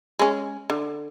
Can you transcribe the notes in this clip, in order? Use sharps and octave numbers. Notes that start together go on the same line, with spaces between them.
G#3 C#4
D3